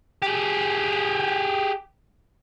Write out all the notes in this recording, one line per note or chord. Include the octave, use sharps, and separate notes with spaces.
G4 G#4